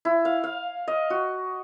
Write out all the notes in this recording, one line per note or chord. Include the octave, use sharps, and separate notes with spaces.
E4
F5
F5
D#5
F#4